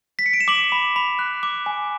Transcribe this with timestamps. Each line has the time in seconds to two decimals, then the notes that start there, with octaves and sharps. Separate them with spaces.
0.19 B6
0.26 C#7
0.33 D7
0.40 E7
0.48 D6 F#7
0.72 B5
0.96 B5
1.19 F#6
1.43 D6
1.66 G#5